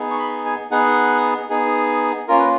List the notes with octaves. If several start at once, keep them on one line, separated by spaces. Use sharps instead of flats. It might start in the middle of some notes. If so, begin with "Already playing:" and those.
Already playing: B3 D#4 G#4
C#6
B5
G#5
B3 D#4 G#4 F#5
B3 D#4 G#4
A#3 C#4 F4 A#4
B4